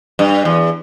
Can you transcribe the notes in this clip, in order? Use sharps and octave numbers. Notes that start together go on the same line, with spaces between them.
G2
E2